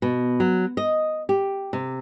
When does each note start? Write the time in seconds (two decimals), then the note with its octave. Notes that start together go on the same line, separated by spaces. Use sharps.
0.02 B2
0.40 F#3
0.77 D#5
1.29 G4
1.73 C3